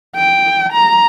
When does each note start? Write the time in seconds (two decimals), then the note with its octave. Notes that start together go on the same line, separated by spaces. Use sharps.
0.16 G5
0.73 A#5